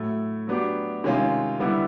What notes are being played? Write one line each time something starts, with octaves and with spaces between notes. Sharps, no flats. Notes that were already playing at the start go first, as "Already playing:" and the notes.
Already playing: A2 F#3 A3
F#3 B3 D4 G4
C3 D#3 G#3 C#4 F4
D3 G3 B3 E4 G4